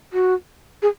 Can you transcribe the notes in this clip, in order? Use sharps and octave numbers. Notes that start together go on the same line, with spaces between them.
F#4
G#4